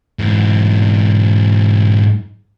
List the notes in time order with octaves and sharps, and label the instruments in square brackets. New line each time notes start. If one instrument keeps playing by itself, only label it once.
[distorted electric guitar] G#2 E3